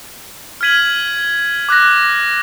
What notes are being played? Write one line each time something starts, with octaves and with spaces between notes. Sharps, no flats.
F6 G#6 B6 D#7 F#7
D6 F#6 A#6